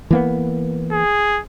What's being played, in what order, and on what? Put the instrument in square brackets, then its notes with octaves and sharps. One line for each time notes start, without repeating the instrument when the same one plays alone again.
[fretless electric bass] E3 A#3 B3
[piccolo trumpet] G#4